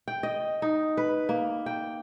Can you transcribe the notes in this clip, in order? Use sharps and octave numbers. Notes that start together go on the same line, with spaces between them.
G5
D#5
D#4
B4
A#3
G5